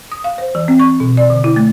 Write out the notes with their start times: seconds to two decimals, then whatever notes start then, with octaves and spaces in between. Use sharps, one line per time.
0.12 D#6
0.24 F5
0.38 C5
0.55 E3
0.68 C4
0.79 C#6
1.00 B2
1.17 D5
1.30 D3
1.44 E4
1.56 A3